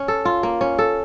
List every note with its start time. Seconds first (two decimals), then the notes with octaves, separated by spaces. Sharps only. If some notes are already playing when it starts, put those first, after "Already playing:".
Already playing: C#4
0.08 A4
0.25 F4
0.43 A#3
0.61 C#4
0.79 A4